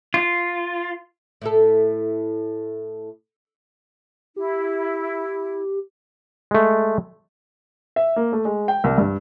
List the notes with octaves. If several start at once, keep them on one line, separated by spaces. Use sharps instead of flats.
F4
A2 E4 A4
E4 G4
G#3 A3
E5
A#3
A3
G#3
G5
C2
G2